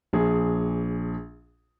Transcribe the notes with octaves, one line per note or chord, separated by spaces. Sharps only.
A#1 G#4